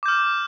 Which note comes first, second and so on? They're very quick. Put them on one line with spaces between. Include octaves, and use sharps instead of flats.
D6 G6 F6